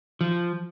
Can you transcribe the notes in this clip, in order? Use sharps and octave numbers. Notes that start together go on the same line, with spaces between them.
F3